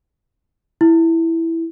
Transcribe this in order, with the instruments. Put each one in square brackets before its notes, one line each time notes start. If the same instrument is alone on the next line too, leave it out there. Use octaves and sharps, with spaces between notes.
[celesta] E4